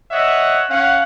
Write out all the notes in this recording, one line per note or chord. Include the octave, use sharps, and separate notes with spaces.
C#5 D#5 E5 F#5
C#4 F5 F#5